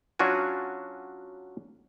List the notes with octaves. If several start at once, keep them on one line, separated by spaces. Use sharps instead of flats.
F#3 C#4 D4 F4 F#4 G#5